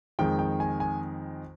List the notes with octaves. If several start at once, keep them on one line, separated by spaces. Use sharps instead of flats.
F2 D#3 G#3 G5
G5
G#5
G#5